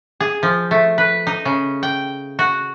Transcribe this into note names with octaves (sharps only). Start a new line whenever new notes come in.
G#4
F3
A3
B4
D#4
C#3
G5
F#4